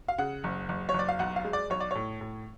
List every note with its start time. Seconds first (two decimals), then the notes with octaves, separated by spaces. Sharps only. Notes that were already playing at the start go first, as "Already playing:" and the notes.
0.08 F5
0.18 C#3 F#5
0.44 F#1
0.69 F#1
0.89 C#5
0.94 F#1
0.99 D5
1.09 F5
1.19 B1 F#5
1.36 F5
1.45 G#3
1.53 D5
1.70 B1 C#5
1.80 D5
1.91 A2 C#5
2.21 A2